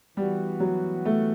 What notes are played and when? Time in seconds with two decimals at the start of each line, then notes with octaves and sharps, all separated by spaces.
0.17 E3 G3 B3 F#4
0.60 F#3
1.05 A3